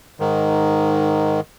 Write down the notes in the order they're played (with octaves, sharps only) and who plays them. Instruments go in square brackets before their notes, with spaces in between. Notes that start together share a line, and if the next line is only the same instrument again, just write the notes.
[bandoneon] G#2 D#3